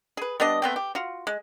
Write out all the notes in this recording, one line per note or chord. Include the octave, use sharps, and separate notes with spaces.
G#4 B4
G3 B3 D4 D#5
A3 B3 C4 G5
G4
F4 F#4
G#3